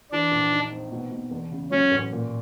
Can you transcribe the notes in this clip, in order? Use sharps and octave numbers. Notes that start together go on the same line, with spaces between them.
E3 D4
A#1
D#4
C4
B2
B2
E2
C#3
F#3 C#4
A1
A#2